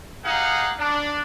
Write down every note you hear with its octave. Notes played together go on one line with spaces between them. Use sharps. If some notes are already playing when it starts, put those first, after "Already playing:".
D#4 G4 G#4 F5 F#5
D4